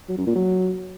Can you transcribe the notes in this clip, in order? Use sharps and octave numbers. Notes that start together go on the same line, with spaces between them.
F#3
F#2
A#2
F#3